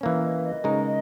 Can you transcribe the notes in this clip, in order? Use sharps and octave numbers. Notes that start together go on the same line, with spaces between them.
E3 A#3 C#4 B4
D#5
E5
D#5
C#3 G#3 D#4 A#4